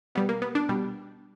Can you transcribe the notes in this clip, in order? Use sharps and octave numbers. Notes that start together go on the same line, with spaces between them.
B2 G3 B3
A#3
B3
D4
B2 G3